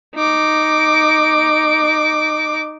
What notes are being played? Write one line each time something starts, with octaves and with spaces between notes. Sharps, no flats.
D#4 D6